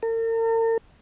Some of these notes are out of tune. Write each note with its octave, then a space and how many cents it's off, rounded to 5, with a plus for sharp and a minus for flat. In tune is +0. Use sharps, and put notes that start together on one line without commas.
A#4 -45